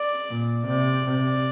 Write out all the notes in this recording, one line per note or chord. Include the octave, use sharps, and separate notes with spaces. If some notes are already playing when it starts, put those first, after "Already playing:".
Already playing: D5
A#2
C3 D5
C3